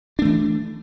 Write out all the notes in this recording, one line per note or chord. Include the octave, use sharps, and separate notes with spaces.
E3 A3 D4